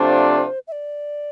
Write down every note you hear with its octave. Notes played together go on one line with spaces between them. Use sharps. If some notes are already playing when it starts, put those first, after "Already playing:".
Already playing: C3 F3 A3 D4 F4 C5
E5
D5